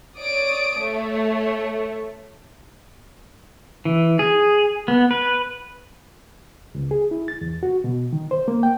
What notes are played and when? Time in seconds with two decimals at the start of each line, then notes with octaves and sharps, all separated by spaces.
0.17 C#5 D5 D#6 D7
0.80 A3 C#5
3.85 E3
4.19 G#4
4.88 B3
5.11 B4
6.75 C#2
6.91 G#4
7.11 E4
7.28 A6
7.41 E2
7.63 F#4
7.84 B2
8.13 D#3
8.31 C5
8.48 A#3
8.63 G5